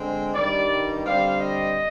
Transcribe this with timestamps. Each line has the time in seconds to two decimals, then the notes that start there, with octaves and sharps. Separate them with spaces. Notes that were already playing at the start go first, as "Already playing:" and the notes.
Already playing: D3 G#3 C4
0.34 G2 D#3 G3 D5
1.05 D3 G3 C4 F5
1.40 D#5